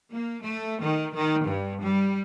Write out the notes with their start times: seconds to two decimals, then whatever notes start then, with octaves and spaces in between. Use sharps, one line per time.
0.11 A#3
0.42 A3
0.83 D#3
1.16 D#3
1.46 G2
1.85 G3